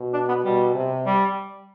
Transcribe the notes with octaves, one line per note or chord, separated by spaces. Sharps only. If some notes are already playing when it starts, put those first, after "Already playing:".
Already playing: B2
D4
B3
B2 G3
C3
G3